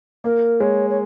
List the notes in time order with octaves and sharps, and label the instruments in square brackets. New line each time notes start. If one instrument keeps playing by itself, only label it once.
[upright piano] A#3 [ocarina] A#4
[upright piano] G#3 [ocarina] C#5
[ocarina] C#5